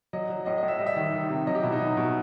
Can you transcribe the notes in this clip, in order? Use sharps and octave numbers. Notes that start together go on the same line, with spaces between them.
F#3 D#5
F#3
A2 D#5
A2 D#5
E5
G3 D#5
E5
D#3
D#3
C3
F#3 D#5
G4
B2 E4
D#4
F#3
B2